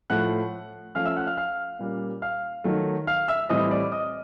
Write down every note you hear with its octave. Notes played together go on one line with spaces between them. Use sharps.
A2 F3 A3 F#5 F#6
F3 A3 C#4 F5 F6
E5 E6
F#5 F#6
F5 F6
F5 F6
A#2 G3 A#3 C#4
F5 F6
D#3 F#3 A3
F5 F6
E5 E6
A2 E3 G3 C4 D#5 D#6
D5 D6
D#5 D#6